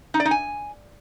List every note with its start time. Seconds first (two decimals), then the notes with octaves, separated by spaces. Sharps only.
0.14 D#4
0.20 D5
0.25 D#4
0.31 G#5